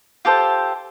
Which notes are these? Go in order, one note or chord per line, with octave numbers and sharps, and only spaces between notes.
F4 G4 A4 C5